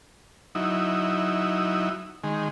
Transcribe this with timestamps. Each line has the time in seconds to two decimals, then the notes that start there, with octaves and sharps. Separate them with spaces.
0.55 F#3 D#4 E4
2.24 D#3 G#3